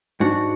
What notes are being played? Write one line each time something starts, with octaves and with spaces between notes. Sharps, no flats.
G#2 D4 F#4